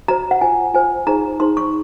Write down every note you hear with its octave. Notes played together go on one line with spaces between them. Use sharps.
F#4 C5 A#5
F#5
F4 C5 G#5
F4 C5 G#5
D#4 G#4 C5 A#5
D#4 G#4 C5 C6
C#6